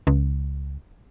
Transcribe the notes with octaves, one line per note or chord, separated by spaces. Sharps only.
C#2